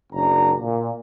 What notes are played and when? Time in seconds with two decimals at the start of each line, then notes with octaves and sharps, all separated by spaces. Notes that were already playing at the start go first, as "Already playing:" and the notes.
0.13 F#1 F#2 D4 A#5
0.60 A#2